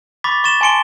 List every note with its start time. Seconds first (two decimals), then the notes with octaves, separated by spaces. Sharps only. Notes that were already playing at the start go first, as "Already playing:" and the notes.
0.24 B5 C#6 D6 A6 B6
0.44 C#6 A6 E7 G7
0.61 G#5 A5 C6 C#7 D7 G7